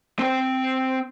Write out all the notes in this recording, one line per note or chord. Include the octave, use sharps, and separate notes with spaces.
C4 G5